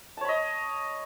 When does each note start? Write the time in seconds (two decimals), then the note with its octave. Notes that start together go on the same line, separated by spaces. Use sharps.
0.17 A5
0.21 C#5
0.25 B5
0.29 D#5